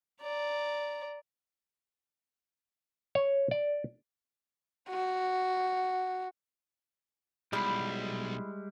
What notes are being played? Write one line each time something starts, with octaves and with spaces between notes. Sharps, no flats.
D5 A#5
C#5
D5
F#4
B1 G3 G#3 E4